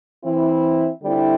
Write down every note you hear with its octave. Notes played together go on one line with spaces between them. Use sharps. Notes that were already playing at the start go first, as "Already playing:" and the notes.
E3 C4 E4
D3 G3 C4 E4